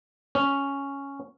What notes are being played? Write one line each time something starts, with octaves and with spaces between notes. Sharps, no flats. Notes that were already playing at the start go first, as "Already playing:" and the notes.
C#4